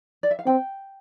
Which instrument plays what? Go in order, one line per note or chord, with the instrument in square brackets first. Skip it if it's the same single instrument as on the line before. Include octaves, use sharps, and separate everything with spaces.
[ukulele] D5
E5
F5
[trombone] C4 [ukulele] G5